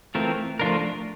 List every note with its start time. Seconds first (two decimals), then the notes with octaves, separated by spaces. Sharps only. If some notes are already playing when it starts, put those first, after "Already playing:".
0.15 E3 A3 C4 F4 A#4
0.59 F3 A3 D4 F4 A#4